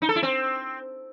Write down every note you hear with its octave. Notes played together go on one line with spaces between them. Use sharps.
D#4
A4
E4
C4